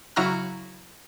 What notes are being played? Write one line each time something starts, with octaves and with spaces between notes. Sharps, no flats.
C#3 F#3 E4 F#4 A#5 F6